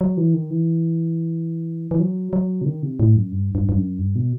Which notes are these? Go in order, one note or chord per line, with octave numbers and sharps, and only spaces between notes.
F#3
E3
D#3
E3
E3
F#3
F#3
C3
D#3
C3
A2
F#2
G2
G2
G2
F#2
G2
B2